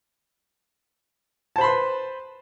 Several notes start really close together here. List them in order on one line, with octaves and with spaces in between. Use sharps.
A5 C5 B5 C6 B4